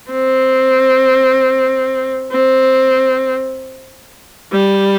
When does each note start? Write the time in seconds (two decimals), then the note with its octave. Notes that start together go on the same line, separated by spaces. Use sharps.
0.12 C4
2.32 C4
4.52 G3